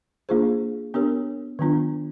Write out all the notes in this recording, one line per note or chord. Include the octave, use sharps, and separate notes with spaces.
A#3 D4 F4 G#4 C5
B3 D4 G4 A#4 C#5
D#3 F#3 B3 D4 F4